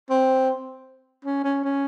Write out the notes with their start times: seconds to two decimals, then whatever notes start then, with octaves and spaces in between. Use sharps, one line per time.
0.10 C4
1.25 C#4
1.44 C#4
1.64 C#4